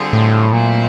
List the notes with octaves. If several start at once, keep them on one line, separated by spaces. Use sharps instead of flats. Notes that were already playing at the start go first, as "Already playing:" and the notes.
Already playing: D3 G3 C4 F4 G#4
A2
A#2 F#3 A3 C4 E4